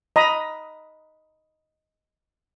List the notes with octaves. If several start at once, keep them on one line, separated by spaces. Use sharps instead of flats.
D#5 A#5 B5 D#6